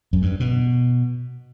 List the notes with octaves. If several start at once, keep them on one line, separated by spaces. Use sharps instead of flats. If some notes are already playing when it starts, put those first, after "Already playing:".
F#2
G2
B2